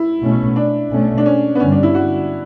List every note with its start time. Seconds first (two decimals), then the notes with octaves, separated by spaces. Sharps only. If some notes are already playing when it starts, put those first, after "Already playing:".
Already playing: E4
0.22 B2 A3 C#4
0.56 D4
0.91 B2 A3 C#4
1.18 D4
1.26 C#4
1.55 B3
1.60 G2 D3 G3 C#4
1.72 D4
1.83 E4
1.95 F#4